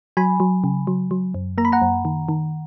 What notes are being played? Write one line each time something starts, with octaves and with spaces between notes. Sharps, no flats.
F#3 G#5 B5
F#3
C#3
F#3
F#3
F#2
A#3 A#5
B5
F#5 A#5
F#2
D#3
D#3